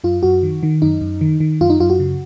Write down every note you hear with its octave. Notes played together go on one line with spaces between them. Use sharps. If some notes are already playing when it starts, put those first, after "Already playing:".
F#2 F4
F#2 F#4
D#3
D#3
F#2 D#4
F#2
D#3
D#3
F#2 F4
D#4
F#2 F4
F#4
C#3